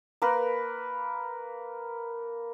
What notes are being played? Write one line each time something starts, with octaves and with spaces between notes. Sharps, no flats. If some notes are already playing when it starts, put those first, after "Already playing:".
A#3 A#4 B4